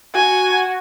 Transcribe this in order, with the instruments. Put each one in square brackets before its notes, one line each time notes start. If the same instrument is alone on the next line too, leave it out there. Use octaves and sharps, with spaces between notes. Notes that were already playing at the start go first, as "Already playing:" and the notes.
[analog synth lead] F#4 [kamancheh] G#5